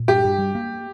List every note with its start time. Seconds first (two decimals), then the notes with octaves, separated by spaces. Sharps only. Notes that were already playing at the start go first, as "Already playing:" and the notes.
Already playing: A#2
0.08 G2 G4
0.24 G2
0.39 G3
0.55 A#3